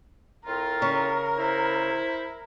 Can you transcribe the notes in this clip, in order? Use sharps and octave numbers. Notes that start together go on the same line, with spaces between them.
A2 C4 F4 A#4
C#3 C#6
E4 C5